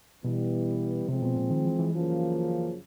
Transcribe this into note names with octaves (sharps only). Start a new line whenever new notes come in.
B2 E3 G3 B3
C3 F3 G#3 C4
B2
A#2
D#3
E3
E3
F#2 C#3 F3 A#3